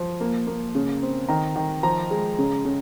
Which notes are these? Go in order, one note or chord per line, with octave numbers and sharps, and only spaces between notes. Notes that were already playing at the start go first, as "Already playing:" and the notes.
Already playing: F3
A#3
A#3
C#3
C4
D#3 A#5
D#3
F3 A#5
G#3
C#3
C#3